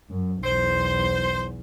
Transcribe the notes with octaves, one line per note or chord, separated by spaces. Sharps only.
F#2
B1 E2 C5